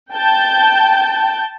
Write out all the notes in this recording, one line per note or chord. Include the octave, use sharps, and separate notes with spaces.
G5 A5 G6